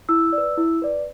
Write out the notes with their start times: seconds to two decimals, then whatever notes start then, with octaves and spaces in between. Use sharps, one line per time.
0.09 E4 E6
0.33 D5
0.38 B4
0.58 E4
0.82 B4 D5